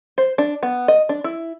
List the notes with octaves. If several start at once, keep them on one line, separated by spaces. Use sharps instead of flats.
C5
D4
B3
D#5
D4
E4